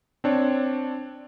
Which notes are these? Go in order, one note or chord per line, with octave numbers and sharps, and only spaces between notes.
C4 D4 C#5